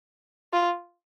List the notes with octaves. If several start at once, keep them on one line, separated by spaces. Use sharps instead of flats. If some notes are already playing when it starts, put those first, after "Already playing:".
F4